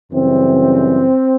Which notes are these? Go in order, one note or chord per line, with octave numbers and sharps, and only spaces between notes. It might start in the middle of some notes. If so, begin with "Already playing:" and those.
F#2 C#3 E3 G3 C4